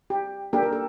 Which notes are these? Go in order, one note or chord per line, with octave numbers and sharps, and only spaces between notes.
G4
A#3 D4 G4 A4
A#4
A4